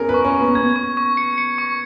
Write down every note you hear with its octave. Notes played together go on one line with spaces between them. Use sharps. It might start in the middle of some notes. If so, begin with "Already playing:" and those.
Already playing: B3 C#4 G#4 A#4
B4
C#6
C#4
C#6
B3
B3 G#6
C#6
C#6
C#7
C#7
C#6